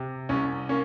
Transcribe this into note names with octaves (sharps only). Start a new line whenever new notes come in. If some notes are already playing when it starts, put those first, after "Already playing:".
Already playing: C3
C2 C#4
A#3 C#4